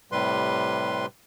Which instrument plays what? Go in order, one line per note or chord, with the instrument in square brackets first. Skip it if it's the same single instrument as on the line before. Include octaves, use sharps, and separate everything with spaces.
[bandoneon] A2 C3 G3 B4 C6